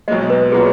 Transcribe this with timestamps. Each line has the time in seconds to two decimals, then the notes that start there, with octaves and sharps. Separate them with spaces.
0.08 B1 B2 G#3 D#5
0.30 B4
0.52 A#2 F#3 B3 F4 G#4